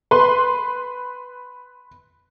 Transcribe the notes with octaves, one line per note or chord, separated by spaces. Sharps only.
B4 C6